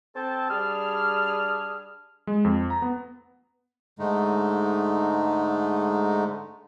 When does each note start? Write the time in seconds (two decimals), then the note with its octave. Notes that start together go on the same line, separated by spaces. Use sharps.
0.16 C4 A4 G5 A5
0.49 G3 D4 G#4 F6
2.27 G#3
2.45 F2
2.70 A#5
2.82 B3
3.99 G#2 D3 G#3 A3 D#4